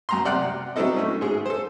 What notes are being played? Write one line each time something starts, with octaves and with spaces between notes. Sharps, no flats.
F#2 A#5 C6
C3 D5 F#5 G5 F6 F#6
F#3 C4 D4 E4 A4 D#5
A3 C#4
G#2 G#3 G#4
A4 C5